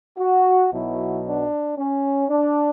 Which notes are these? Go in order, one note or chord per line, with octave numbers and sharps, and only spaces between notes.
F#4
B1 B2 F#3 B3 E4
D4
C#4
D4